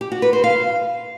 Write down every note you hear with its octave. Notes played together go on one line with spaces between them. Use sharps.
G4
F#4
B4
C5
F5